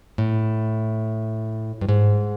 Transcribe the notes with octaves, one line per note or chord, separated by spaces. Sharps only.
A2
G2
G#2